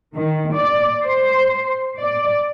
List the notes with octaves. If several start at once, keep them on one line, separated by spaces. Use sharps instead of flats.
D#3
D5
C5
D5